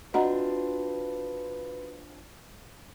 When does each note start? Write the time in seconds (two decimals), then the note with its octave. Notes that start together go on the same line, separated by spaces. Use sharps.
0.14 C4 D4 F4 F#4 B4 D#5 F#5 A#5